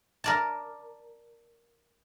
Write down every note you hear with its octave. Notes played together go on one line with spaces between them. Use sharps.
A#4 D5 A5